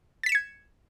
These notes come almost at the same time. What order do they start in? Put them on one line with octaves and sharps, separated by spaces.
A6 B6 E7 C#7 G#6